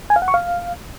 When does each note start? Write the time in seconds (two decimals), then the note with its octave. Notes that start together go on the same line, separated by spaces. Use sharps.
0.10 G#5
0.16 F5
0.22 F#5
0.28 C#6
0.34 F5